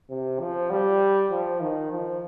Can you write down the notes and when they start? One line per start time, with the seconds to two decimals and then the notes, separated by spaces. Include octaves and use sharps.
0.10 C3
0.40 F3
0.70 G3
1.31 F3
1.61 D#3
1.92 F3